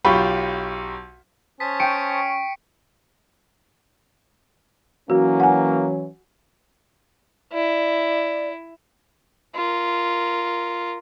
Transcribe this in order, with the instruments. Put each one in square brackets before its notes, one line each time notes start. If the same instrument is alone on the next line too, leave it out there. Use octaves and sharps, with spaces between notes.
[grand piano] B1 F4 G4 B5 C#6
[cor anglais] C#4 [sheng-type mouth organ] C5 A5 D#6 [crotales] B6
[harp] G5 [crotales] C#6 C#7 D7
[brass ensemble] E3 F#3 C#4 [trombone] A#3 [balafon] F#4
[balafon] F#5 G#5
[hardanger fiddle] E4 [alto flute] D5
[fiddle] F4 A#4